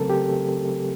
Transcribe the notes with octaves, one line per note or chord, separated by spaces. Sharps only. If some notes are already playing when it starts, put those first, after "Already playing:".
Already playing: C#3 F#3 A3 C4 A4 A#4
G4